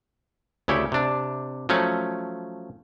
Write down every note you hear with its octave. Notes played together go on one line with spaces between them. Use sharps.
D2 C#3 E4 G4 C#5
C3 D4
F3 F#3 A3 C#4